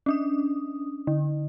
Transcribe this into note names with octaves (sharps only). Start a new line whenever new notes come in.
C#4 D4 D#6
D3